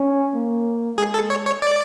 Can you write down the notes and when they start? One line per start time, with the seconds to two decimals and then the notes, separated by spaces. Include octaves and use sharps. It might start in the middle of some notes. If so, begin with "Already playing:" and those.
Already playing: C#4
0.35 A#3
0.98 G#3 G#4
1.14 A4
1.30 C#5
1.46 C#5
1.62 D5